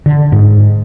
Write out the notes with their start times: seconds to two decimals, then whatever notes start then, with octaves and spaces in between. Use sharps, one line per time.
0.06 D3
0.32 G#2